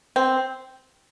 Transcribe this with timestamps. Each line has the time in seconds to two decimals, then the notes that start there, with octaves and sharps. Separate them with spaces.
0.16 C4